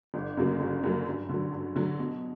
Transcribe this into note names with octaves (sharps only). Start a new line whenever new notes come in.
G1
F#2 C#3 F#3 A#3
G1
F#2 C#3 F#3 A#3
G2
D3 F#3
G2
D3 F#3
B2